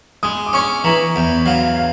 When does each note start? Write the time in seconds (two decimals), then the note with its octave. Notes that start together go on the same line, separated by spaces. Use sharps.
0.23 G#3 D#6
0.46 D6
0.53 C#4 C#6
0.84 E3 A#5
1.16 E2
1.46 F#3 F5
1.77 F5